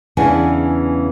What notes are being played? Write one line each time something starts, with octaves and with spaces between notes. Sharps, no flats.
E2 C#3 E3 D4 G#5